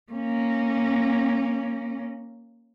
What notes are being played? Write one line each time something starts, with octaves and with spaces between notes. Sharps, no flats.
A#3 C#4